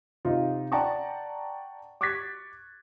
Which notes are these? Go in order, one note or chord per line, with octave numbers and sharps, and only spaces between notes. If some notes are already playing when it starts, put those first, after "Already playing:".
C3 D#4 F4
D5 F#5 G5 A5 A#5 C#6
C#6 D6 F#6 G#6 A6 B6